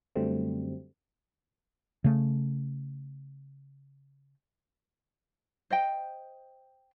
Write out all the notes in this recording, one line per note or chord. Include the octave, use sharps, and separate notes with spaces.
F#2 D3 F#3 G3 A3 C4
C#3 A3
C5 D#5 G5